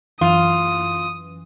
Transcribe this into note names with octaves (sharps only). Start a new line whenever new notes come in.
F#2 E3 F4 D#6